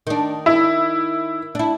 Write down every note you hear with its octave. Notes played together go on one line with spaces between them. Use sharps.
D#3 D4
E4
D4 E4